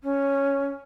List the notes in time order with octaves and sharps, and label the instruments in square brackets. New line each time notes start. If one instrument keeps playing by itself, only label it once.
[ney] C#4